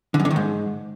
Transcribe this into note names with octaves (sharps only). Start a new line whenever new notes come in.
D3
F#2
D3
D#3
G#2